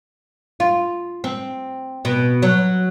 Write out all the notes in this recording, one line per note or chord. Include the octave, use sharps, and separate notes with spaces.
F4
C4
B2
F#3